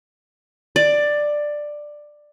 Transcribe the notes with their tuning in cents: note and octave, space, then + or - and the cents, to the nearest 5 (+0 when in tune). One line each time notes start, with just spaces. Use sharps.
D5 +10